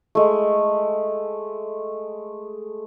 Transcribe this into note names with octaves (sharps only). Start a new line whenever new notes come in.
G#3 A3